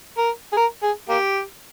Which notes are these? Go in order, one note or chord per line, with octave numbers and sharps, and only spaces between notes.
A#4
G#4
A#4
G#4
A#3 G4